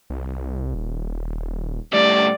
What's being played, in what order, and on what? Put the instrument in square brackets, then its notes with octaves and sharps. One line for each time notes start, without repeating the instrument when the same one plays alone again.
[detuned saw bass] C2
D#1
[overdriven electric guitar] A2 G3 [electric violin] D5